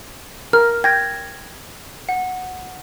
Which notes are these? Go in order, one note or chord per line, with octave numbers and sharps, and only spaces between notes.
A#4 F6
G5 G#6 A#6
F#5